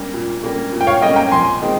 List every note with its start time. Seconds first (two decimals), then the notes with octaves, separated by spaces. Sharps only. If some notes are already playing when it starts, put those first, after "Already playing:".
Already playing: G3 A#3 C#4
0.13 A#2
0.43 G3 A#3 C#4
0.72 A#2
0.81 G5
0.87 C#5 F5
1.02 G3 A#3 C#4 D#5 G5
1.16 G5 A#5
1.31 A#1 G#5 C6
1.62 D#3 G#3 C4